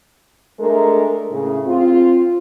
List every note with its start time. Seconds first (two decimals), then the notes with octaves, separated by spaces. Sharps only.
0.59 G#3 A3 D4 A#4
1.31 A2 C#3
1.66 C4 F4